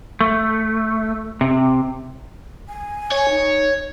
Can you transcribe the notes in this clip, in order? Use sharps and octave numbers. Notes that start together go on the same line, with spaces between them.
A3
C3
G#5
C#5
D#4